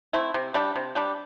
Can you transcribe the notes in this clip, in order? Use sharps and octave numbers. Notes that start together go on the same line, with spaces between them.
A3 C4 E4
C3
G3 D4 G4
C3
G3 D4 G4